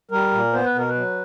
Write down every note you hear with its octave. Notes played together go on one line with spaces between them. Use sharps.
G3 A#4
A#2
B3 C5
B4
B2 A#4
B4
F#3